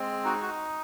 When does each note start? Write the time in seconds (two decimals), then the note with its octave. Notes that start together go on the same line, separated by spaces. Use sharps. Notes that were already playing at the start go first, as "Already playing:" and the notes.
Already playing: G#3 C4
0.24 D#4 F#4
0.42 F#4